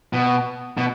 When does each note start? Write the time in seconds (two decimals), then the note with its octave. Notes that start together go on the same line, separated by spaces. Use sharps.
0.13 B2
0.77 B2